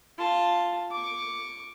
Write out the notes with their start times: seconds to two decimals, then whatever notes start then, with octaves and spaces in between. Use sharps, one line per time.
0.18 F4 A5
0.91 C#6 D6